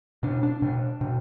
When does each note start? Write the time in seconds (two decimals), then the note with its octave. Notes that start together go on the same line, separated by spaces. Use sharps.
0.23 B2 D4
0.43 D4
0.62 B2 D4
1.01 B2